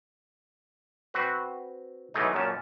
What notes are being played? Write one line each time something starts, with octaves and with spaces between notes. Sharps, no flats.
C4 F#4 B4
E3 F#3 G#3 A3 D#4
F#2 A#2 C#4 A5